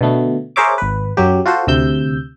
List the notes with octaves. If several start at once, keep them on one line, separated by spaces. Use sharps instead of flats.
B2 D3 A3 B3
G#4 A#4 C5 C#5 E5 D6
G#1 B4
F#2 F#3 G4
F4 F#4 A4 C5
D2 C3 E6 G6